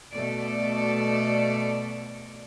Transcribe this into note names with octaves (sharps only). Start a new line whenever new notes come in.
B2 A3 A4 D5